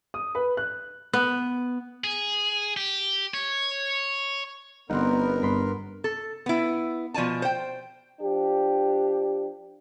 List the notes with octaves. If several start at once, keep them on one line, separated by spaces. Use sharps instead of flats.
D#6
B4
F#6
B3
G#4
G4
C#5
G1 B3 C4 D#4 A#4 F#5
G2 B5 C6
A4
B3 E4
B2 F3 D5 G#5 A5
C5 G5
F3 D4 G4